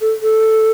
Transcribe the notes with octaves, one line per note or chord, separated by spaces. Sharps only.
A4
A4